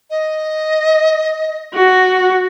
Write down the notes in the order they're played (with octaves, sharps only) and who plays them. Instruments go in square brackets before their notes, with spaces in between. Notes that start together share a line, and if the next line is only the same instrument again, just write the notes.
[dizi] D#5
[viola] F#4